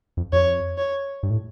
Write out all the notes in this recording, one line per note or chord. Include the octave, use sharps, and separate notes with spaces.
F2
F2 C#5
C#5
G2
A2